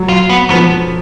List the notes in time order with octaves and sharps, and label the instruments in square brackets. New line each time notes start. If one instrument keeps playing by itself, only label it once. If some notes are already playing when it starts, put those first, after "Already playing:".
Already playing: [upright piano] F#3
[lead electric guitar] F4
B3
[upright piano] F3 [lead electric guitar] B3